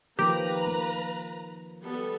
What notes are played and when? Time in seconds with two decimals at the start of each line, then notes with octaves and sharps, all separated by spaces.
0.19 D#3 F3 A#3 G4 B4 A#5
0.67 A#3
1.83 G3 B3 A4